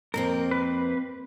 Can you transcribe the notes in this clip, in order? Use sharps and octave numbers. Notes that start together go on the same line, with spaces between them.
F2 A#3 C4 A#4
B4